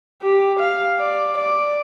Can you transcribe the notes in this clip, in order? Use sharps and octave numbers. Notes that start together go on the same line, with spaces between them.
G4
F5
D5
D5